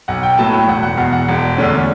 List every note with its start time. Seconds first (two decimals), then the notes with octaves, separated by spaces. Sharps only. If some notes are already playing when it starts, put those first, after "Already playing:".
0.08 B1 F#5
0.23 G5
0.38 A2 F#3 B3 A5
0.54 G5
0.67 E1 F#5
0.83 F#5
0.97 E2 B2
1.13 F#5
1.28 E1
1.58 E2 D3 A3 C#4 D5